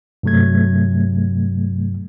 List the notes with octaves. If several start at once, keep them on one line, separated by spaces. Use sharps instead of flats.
G2 C3 F#3 A3 G#6